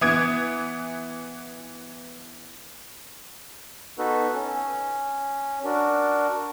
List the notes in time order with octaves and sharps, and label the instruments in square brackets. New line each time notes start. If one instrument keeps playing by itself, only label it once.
[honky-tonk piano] E3 B3 D#6 G#6 D7
[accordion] B3 D#4 F#4 A4 B4
C#4
D4 F#4 A#4